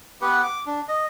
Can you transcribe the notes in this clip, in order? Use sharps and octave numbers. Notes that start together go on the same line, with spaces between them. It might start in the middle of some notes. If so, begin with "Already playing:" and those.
B3 G4 B4 F#5
D6
D4
D#5